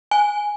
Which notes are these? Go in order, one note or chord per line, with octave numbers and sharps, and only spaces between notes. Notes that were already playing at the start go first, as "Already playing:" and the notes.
G#5